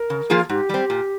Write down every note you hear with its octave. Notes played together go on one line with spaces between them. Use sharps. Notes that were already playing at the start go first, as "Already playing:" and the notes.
Already playing: A#4
C#3
F3 A#3 F4 G#4
G#2 G4
G3 C4
A#2